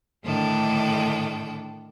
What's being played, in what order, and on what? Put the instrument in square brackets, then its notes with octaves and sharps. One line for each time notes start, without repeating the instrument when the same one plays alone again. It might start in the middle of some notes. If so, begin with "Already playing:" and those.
[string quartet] A2 D3 D#3 D4 A4 G5